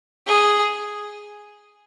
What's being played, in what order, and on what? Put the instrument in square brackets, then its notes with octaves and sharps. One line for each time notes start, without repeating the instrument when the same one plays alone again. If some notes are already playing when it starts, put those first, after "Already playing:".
[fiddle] G#4